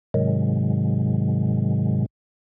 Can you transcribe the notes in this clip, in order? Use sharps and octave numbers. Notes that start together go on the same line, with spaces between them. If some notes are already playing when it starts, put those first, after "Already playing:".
G#2 C3 D#3 F#3 G#3